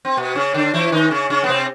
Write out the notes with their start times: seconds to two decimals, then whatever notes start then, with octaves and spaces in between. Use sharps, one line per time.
0.05 C4
0.17 B2 B3
0.35 C#3 C#4
0.54 D3 D4
0.74 E3 E4
0.92 D#3 D#4
1.11 C#3 C#4
1.30 C#3 C#4
1.44 B3
1.49 C3 C4